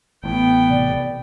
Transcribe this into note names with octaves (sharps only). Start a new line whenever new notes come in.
A1 A2 B3 G5
C3 D5